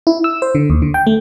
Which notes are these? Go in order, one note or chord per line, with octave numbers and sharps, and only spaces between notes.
E4
E6
C5
D3
D#2
D3
G5
A3